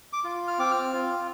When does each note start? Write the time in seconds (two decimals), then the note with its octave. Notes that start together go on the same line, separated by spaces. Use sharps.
0.13 D6
0.24 F4
0.48 F6
0.59 C4 D6
0.71 F6
0.93 F4